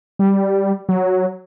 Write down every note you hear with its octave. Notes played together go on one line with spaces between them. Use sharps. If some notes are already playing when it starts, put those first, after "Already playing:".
G3
F#3